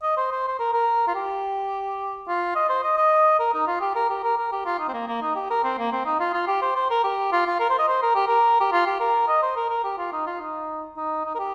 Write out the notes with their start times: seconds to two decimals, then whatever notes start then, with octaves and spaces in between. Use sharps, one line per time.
0.03 D#5
0.17 C5
0.31 C5
0.48 C5
0.59 A#4
0.73 A#4
1.08 F4
1.15 G4
2.28 F4
2.55 D#5
2.69 C5
2.84 D#5
2.97 D#5
3.40 A#4
3.54 D#4
3.68 F4
3.81 G4
3.96 A#4
4.10 G4
4.24 A#4
4.38 A#4
4.52 G4
4.66 F4
4.79 D#4
4.88 C4
4.94 A#3
5.08 A#3
5.22 D#4
5.36 G4
5.50 A#4
5.64 C4
5.78 A#3
5.92 C4
6.06 D#4
6.20 F4
6.34 F4
6.48 G4
6.62 C5
6.76 C5
6.90 A#4
7.04 G4
7.32 F4
7.47 F4
7.60 A#4
7.70 C5
7.79 D#5
7.88 C5
8.03 A#4
8.15 G4
8.28 A#4
8.61 G4
8.73 F4
8.86 G4
9.00 A#4
9.28 D#5
9.43 C5
9.56 A#4
9.70 A#4
9.84 G4
9.98 F4
10.13 D#4
10.27 F4
10.41 D#4
10.97 D#4
11.25 D#4
11.35 A#4
11.39 G4